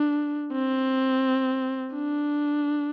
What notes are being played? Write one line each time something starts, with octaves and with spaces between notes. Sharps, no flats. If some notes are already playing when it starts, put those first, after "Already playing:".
Already playing: D4
C4
D4